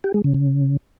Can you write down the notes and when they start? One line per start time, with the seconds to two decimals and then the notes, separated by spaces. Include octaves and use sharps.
0.04 G4
0.14 G#3
0.24 C#3
0.34 C#3